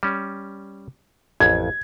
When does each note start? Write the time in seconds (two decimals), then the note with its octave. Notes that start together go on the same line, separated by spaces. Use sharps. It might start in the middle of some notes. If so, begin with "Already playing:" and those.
0.03 G3 C#4
1.40 A1 F2 G#6